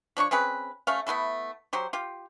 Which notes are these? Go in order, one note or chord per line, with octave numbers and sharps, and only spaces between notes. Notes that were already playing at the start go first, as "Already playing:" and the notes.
F3 D4 C#5 C#6
C4 C#4 G#4 B4
A3 C#4 F5
A3 B3 E4 A4
F#3 G4 C5
F4 G4